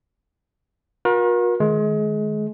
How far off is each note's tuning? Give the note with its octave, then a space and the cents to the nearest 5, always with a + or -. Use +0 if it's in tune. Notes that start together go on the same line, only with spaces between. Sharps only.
F#4 -45 A#4 +40
D#3 -15 G#3 +30